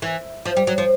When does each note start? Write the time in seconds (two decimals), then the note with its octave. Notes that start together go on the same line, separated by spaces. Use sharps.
0.02 E3
0.46 F3
0.57 G3
0.67 F#3
0.78 F3